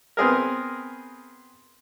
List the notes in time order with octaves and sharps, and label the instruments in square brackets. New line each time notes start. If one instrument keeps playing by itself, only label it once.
[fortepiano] B3 C4 G#4 A#4